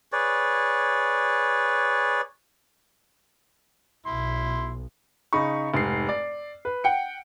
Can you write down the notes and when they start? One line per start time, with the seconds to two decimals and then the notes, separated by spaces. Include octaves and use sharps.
0.12 G#4 B4 C#5 D5
4.06 B1 E4 C6
5.33 C#3 D#4 B5 C#6
5.74 F1 G#2 C7
6.09 D5
6.65 B4
6.84 F#5 G5 C#7